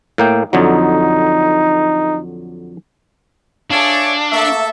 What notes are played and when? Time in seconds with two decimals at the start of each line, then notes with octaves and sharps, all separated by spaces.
0.18 A2 A#3 G5
0.53 F2 D3 F#3 D#4
3.70 D4 G#4 A4 C#5 D5 E5 F5
4.31 A3 A#3 A4 E5